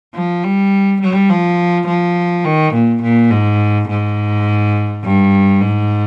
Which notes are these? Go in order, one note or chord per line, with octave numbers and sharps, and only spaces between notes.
F3
G3
G3
F3
F3
D#3
A#2
A#2
G#2
G#2
G2
G#2